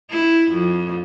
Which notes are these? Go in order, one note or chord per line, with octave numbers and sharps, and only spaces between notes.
E4
F2